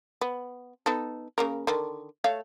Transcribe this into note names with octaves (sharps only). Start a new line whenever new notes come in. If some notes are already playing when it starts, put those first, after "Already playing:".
B3
B3 D#4 A4
C#3 A#3 A#4
D3 D#3
A3 C#5 F5